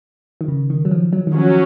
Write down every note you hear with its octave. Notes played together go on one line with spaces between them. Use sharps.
D#3
C#3
D#3
F#3
F3
F#3
D#3
F3 F#3 C#4